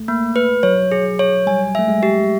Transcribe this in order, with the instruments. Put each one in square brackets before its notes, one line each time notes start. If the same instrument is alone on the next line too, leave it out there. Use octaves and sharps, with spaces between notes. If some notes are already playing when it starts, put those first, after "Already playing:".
Already playing: [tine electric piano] A3
[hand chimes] A#3
B4
[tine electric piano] F#3 [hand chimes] C#5
[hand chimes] G#4
C#5
[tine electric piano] G3 [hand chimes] G#5
[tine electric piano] A3 [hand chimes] E5
[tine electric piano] G#3
[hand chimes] G4